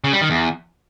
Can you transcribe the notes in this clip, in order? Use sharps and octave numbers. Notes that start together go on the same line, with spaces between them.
C#3
G3
D#3
E2